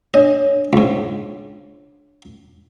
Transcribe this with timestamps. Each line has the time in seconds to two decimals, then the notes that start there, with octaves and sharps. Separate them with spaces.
0.14 D4 C#5 D#5
0.73 C#2 G#2